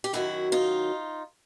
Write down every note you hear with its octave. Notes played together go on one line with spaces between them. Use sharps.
G4
F#2 D#3 F#3 E4 F#4
D#4 F4